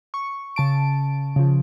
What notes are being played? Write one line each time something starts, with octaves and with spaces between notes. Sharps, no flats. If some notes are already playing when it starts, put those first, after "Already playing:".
C#6
C#3 A5 D7
C#3 F3